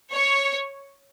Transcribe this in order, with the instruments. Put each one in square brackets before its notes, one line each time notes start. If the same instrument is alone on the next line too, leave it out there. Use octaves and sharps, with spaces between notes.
[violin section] C#5